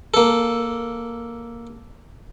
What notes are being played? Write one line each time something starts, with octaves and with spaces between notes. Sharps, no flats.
A#3 A4